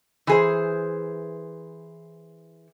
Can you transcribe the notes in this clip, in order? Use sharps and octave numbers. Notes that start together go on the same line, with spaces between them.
E3 G#4 C5